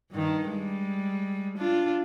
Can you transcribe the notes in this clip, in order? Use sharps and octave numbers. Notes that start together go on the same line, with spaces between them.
G2 D#3
G3 G#3
D4 F4